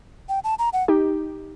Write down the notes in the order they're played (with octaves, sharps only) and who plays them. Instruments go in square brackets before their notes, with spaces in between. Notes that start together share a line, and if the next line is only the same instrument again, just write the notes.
[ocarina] G5
A5
A#5
F#5
[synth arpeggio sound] D#4 G4